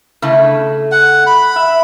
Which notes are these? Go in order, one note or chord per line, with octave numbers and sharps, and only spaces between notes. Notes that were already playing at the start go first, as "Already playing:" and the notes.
C#3 A3 E4
F#5
B5
E5